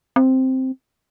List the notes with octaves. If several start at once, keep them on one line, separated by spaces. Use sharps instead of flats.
C4